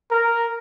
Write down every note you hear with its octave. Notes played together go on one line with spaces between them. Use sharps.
A#4